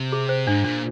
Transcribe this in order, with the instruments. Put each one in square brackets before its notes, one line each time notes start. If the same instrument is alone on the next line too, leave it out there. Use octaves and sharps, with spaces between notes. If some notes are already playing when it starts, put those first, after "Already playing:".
Already playing: [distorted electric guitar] C3
[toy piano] G#4
C5
[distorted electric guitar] G#2 [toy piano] D4
[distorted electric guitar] A#2 [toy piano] D4